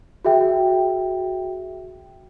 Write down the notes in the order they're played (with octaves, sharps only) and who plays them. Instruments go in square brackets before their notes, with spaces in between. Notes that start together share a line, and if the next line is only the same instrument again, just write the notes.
[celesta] F#4 G#4 E5 G5